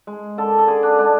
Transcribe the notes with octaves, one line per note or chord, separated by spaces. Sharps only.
G#3
D3 A4
A4
D3 G#4
D4
G#3 D4